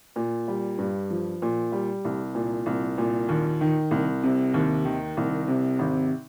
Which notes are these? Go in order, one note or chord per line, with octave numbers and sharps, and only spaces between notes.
A#2
G3
G2
F3
A#2
G3
C2
A#2
C2
A#2
D#2
D#3
C2
C3
D#2
D#3
C2
C3
G#1